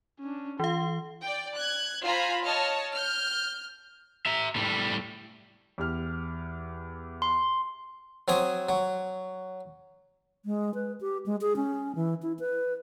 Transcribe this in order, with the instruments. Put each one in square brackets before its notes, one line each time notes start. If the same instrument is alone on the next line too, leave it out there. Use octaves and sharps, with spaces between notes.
[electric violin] C#4 D4
[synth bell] E3 F5 [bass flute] F4 [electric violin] C6
[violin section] D5 G5
F#6 G#6
F4 C5 G#5 A#5 B5
C#5 D#5 A5 F6
F6 G6
[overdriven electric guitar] E5 A#5
A2 G3
[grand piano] E2 G4 F6
[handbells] C6
[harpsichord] F#3 C4 G#5 D#6
F#3
[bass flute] G#3
B4
G4
G#3
G#4
C#4
E3
E4
B4